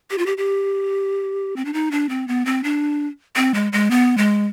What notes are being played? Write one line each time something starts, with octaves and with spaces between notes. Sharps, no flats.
G4
F4
G4
G4
C4
D4
D#4
D4
C4
B3
C4
D4
C4
G#3
G#3
B3
G#3